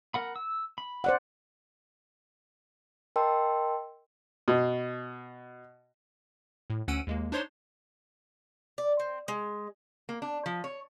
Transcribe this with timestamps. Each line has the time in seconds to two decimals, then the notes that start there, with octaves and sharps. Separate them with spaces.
0.14 A#4 F#5 B5
0.36 E6
0.78 B5
1.04 C5 D5 F#5
3.16 A#4 D#5 G5 A5 C6 E6
4.48 B2
6.70 A2
6.88 D2 C#4 F#5 E6 D7 D#7
7.07 D#2 G#3 A#3
7.32 D4 D#4 C5 C#5 C6
8.78 D5
9.00 C4
9.28 G#3
10.09 A#3
10.22 D4
10.46 F3
10.64 C#5